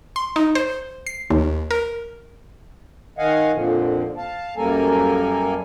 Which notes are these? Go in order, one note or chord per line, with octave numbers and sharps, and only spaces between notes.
C6
D#4
C5
C7
D#2
A#4
D#3 D#5 F5 F#5 G#5
F2 A#2 D3 F3
F5 A5
F#2 G3 A#3 A4 A#4 G#5